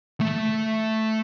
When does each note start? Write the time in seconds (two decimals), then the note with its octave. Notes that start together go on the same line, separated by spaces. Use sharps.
0.21 A3 E5